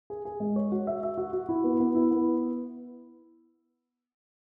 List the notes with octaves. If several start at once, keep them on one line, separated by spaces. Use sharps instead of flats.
G#4
G#4
G#3
C#5
F#4
E5
E5
F#4
F#4
E4
B3
B3
E4
B3